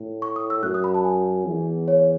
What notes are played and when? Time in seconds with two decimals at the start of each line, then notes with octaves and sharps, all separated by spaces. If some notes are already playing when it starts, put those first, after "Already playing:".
Already playing: A2
0.22 C#6
0.36 D#6
0.50 E6
0.63 F#2 F#6
0.74 D#6
0.84 B5
0.94 A5
1.04 G#5
1.46 E2
1.88 C#5